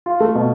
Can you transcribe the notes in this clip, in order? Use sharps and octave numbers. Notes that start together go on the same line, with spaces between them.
F4
A3
B2